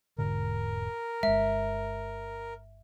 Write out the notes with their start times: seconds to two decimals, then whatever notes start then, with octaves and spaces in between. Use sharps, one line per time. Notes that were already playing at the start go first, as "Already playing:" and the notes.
0.18 E1 G#2 D3 A#4
1.23 G1 G#3 E5